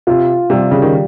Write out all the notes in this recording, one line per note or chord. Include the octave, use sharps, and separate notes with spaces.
C3 F4
C3 G3
C#3
D#3